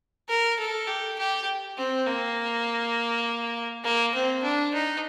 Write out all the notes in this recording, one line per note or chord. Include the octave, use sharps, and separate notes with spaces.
A#4
A4
G4
G4
C4
A#3
A#3
C4
D4
D#4